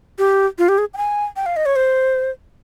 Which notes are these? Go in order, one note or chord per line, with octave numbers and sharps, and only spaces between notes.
G4
F4
G4
G#4
G5
G#5
G5
F5
D#5
C#5
C5